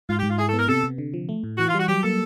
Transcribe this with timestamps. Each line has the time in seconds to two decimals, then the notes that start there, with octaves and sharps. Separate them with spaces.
0.09 G#2 F4
0.18 G4
0.23 G#2
0.29 F4
0.38 E4 G#4
0.48 B3 A4
0.59 A#4
0.68 C3 A4
0.84 C3
0.98 D3
1.14 F3
1.29 A3
1.44 A2
1.58 E3 F#4
1.68 F4
1.74 G3 F#4
1.88 F#3 G4
2.03 A#3 A4